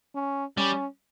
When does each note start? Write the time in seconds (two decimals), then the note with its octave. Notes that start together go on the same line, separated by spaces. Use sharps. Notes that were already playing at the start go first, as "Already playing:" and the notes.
0.15 C#4
0.57 G3 C#4